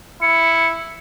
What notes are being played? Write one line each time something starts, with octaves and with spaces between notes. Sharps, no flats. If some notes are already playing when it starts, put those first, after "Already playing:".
E4 C#7